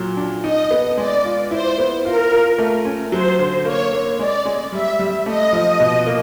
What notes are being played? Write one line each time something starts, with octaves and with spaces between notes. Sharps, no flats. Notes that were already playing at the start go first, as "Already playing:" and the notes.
Already playing: A#2 F#3
D4
D#4 D#5
B3
G#3 D5
F4
E4 C5
B3
F4 A#4
F4
A3
C#4
F#3 C5
D3
A#3 C#5
A#3
G#3 D5
G#3
G3 E5
G3
A3 D#5
F3
B2
A#3